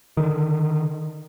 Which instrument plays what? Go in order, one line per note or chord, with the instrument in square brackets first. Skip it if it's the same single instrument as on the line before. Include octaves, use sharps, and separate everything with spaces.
[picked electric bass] D3 D#3